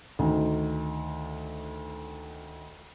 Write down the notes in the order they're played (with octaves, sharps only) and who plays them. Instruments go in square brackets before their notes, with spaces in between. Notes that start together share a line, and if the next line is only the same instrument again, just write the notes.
[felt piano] D2 D#3 D#4